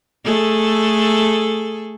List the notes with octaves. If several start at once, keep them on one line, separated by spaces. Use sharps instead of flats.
A3 G#4 A4